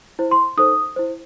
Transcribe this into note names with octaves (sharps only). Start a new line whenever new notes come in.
E4 C5
C6
D#4 A4 C5 D#6
E4 C5